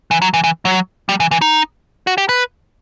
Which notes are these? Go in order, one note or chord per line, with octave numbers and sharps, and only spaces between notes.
E3
F#3
E3
E3
F#3
G3
E3
E3
D#4
F#4
G4
B4